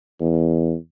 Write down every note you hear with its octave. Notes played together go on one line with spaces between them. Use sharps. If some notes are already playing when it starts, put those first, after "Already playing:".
E2